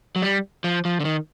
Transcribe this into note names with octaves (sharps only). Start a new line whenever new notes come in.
F#3
G3
F3
F3
D3
D#3